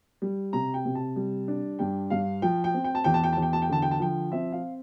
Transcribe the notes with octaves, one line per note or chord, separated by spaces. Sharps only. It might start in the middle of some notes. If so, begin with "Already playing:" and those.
G3
C3 A#5
G5
C3
A5
G3
D4
G2 G5
G2 F5
F3 G5
G5
C4
G5
A5
E2 G5
A5
G5
E2 A5
G5
A5
G5
D3 A5
G5
A5
F3 G5
C4 E5
F5